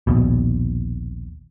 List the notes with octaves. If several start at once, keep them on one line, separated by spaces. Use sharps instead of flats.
A#1 D#2 B2